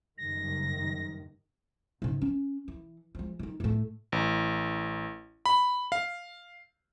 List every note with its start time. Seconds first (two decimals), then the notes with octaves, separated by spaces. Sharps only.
0.18 F#1 G2 D#3 A#6
2.02 G#2 C#3
2.22 C#4
2.68 E3
3.15 F3 G#3
3.39 D#3 E3
3.60 A2 A3
4.12 A1
5.45 B5
5.92 F5